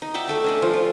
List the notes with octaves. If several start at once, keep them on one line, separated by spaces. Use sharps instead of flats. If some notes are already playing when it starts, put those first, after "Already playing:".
D#4
D5 E5 F#5 G5
A3 A4 E5
C#4 D4 D5
F3
F4